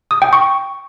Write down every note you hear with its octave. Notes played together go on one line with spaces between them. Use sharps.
D#6
G5
C#6